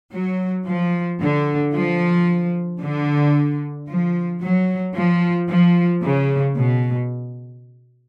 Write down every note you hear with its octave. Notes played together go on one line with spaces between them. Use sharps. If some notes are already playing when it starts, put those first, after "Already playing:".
F#3
F3
D3
F3
D3
F3
F#3
F3
F3
C#3
B2